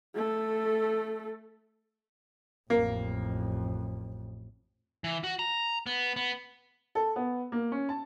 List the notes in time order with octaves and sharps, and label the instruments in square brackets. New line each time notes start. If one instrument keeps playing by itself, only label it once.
[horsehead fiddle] A3 A4
[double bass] A1 F2 [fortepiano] A#3
[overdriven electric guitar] E3
F#4
A#5
B3
B3
[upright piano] A4
B3
A#3
C#4
A5